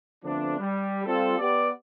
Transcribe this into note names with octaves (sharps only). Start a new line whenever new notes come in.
D3 F3 A3 B3 C4 D4
G3
G3 C4 F4 A4
B3 G4 D5